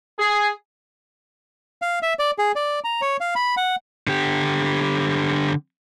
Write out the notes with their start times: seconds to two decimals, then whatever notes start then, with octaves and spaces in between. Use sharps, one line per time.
0.19 G#4
1.82 F5
2.03 E5
2.19 D5
2.38 G#4
2.56 D5
2.84 A#5
3.01 C#5
3.20 F5
3.36 B5
3.57 F#5
4.07 D3 G4